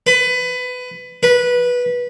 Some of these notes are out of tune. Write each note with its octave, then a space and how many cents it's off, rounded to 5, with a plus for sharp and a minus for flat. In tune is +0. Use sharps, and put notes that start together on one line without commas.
B4 +20
B4 -15